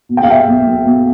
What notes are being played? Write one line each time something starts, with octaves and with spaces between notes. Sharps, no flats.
B2
G5
F5
G3 E5 G5
B1
B1
B2